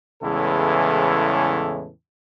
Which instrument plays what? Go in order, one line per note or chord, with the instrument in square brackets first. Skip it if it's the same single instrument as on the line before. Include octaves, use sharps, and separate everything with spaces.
[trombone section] E2 A2 C#3 E3 G#3 A4